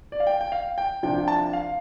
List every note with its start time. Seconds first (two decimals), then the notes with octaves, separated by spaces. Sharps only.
0.12 D5
0.20 F5
0.27 G5
0.41 G5
0.52 F5
0.78 G5
1.02 C2 C3 F3 D4 G5
1.18 G5
1.28 A5
1.53 F5